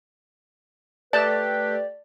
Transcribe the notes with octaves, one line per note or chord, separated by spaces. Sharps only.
A3 G4 B4 D5 A5